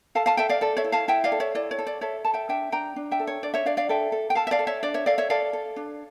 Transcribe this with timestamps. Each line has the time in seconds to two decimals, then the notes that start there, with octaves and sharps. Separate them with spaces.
0.15 A4 F5 A5
0.26 F5 A5
0.37 A4 E5 G5
0.49 D5 F5
0.61 A4 D5
0.77 C#5 E5
0.84 E4
0.92 F5 A5
1.08 E4 E5 G5
1.24 D5 F5
1.32 A4
1.40 C#5 E5
1.55 E4 D5
1.71 C#5
1.79 A4
1.87 D5
2.01 A4 C#5 E5
2.25 A4 A5
2.34 E5 G5
2.49 D4 E5 G5
2.72 D4 G5 A#5
2.96 D4
3.11 E5 G5
3.19 A4
3.27 C#5
3.43 D4 D5
3.54 C#5 E5
3.65 D4 D5 F5
3.77 D5 F5
3.89 A4 E5 G5
4.12 A4
4.30 G5
4.35 A4 F5 A5
4.47 E5
4.51 D5 F5
4.59 A4
4.67 C#5 E5
4.83 D4 D5
4.94 C#5 E5
5.06 A4 D5 F5
5.18 C#5 E5
5.30 A4 D5 F5
5.53 A4
5.76 D4